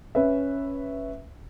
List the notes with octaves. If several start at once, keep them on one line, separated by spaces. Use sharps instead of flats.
C#4 B4 E5